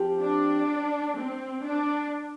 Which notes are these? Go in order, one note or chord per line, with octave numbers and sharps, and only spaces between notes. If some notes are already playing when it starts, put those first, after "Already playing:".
Already playing: F3 C4 G4
D4
C4
D4